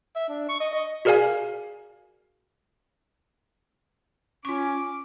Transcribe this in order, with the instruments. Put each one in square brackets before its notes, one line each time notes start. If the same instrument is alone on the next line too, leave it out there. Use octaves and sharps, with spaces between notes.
[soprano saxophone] E5
D4
C#6
D#5
D#5
[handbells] F#4 G#4 A#4 D5 F5 G#5
[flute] C#4 [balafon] F4 C#6 [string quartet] D6